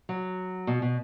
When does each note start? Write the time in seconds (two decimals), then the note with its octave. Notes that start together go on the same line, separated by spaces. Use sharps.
0.09 F#3
0.67 B2
0.82 B2